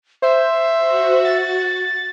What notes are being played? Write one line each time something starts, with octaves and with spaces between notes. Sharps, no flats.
C5 E5
F#4
A6